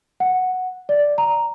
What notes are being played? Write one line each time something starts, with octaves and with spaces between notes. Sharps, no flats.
F#5
D5
A#5